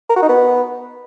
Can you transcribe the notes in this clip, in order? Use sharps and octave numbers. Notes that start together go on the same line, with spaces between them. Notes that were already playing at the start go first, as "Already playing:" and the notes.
A#4
F#4
D#4
B3